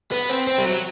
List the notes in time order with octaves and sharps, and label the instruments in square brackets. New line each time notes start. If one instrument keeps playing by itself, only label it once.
[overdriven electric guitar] B3
C4
C4
G3
F#3